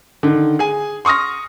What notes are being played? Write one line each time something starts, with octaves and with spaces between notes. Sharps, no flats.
D3 D#3
G#4 G#5
C6 C#6 D#6 F6 A#6